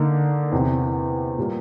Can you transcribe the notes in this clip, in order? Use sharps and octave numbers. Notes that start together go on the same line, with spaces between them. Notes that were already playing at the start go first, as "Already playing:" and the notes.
Already playing: D3 A#3 D#4
E2 C3 E3
A#2 G3 A#3